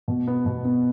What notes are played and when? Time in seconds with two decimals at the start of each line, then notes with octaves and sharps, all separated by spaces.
0.08 B2
0.27 B3
0.46 B2
0.65 B3